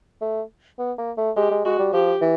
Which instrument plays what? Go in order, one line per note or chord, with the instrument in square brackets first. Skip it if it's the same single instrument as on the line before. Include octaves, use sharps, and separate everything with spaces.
[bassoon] A3
B3
A#3
A3
[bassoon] G#3 [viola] G4
[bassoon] G#3
[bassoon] G#3 [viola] F#4
[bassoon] G3
[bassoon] F3 [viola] G4
[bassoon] E3